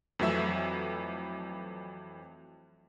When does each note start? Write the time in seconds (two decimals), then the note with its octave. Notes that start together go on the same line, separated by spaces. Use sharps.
0.19 F2 E3 F#3 A3 E5 E6